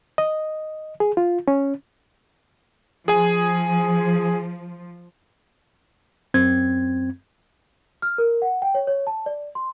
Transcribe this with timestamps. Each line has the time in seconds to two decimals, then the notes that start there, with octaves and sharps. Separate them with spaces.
0.18 D#5
1.00 G#4
1.17 F4
1.48 C#4
3.08 F3 G#4 G#5
6.34 F#2 C4 G#6
8.02 F6
8.18 A#4
8.42 F#5
8.62 G5
8.75 C#5
8.87 C#5
9.07 A5
9.26 D5
9.55 C6